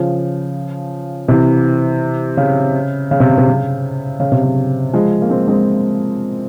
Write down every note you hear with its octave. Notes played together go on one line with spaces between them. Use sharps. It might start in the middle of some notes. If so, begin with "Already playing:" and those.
Already playing: C#3 F3
C3 E3
C#3
C#3
C3
C#3
C3
C#3
C#3
C3
C#3
F3 G#3
A#3
G#3 C4
G#3 C4